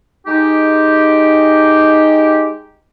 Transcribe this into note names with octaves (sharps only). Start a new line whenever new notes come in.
G#3 D#4 G4